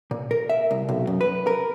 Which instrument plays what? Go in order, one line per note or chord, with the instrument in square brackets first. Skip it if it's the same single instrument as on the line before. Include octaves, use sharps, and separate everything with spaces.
[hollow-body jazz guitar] A#2
A#4
E5
C2
B1
F#2
B4
A#4